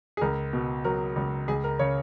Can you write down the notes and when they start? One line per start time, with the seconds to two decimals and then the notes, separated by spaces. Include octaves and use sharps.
0.17 G#4
0.21 C#2 A#4
0.53 B2
0.84 F#3 A#4
1.16 C#2
1.48 C#2 G#4
1.64 A#4
1.79 C#3 C#5